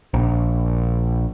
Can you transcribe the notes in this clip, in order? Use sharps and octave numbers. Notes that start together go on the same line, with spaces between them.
A#1